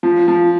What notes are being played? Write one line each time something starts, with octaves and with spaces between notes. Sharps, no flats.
F3
F3